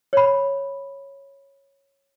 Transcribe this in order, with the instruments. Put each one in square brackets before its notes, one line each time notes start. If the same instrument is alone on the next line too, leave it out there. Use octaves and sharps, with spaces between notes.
[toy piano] C#5 B5